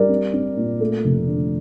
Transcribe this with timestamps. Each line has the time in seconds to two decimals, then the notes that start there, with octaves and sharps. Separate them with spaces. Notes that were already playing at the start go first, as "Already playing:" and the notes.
Already playing: G3 A#4 D5
0.09 C4
0.33 C4
0.57 A#2
0.80 A3
1.05 F1
1.27 D3